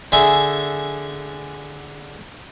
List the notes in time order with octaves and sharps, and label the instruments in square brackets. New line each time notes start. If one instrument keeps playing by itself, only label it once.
[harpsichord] D3 G#4 E5 G#5